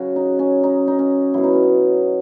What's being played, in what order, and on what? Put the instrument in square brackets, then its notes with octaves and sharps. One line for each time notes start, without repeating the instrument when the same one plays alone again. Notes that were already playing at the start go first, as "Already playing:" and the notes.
Already playing: [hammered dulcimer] C#3 F#3 F#4
D#4
C#4
D#4
D#4
C#4
B2 F#3 E4
D#4
C#4
D#4